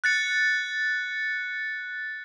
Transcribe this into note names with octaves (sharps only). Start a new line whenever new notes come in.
F#6 A6 C#7